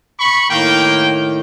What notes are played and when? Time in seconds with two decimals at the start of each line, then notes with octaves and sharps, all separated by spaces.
0.20 B5 C#6
0.50 A2 D#3 A#3 G5